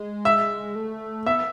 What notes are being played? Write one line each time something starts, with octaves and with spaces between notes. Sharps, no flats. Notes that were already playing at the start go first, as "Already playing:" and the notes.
Already playing: G#3
E5
A3
B3 E5